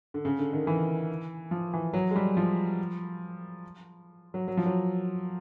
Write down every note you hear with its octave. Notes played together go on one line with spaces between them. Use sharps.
D3
C#3
D3
D#3
E3
F3
E3
F#3
G#3
G3
F3
F#3
F#3
F3
F#3